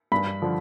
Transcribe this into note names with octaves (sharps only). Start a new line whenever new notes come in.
G2 B5
D3 F3